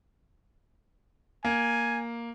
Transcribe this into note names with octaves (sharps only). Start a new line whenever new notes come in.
A#3 G#5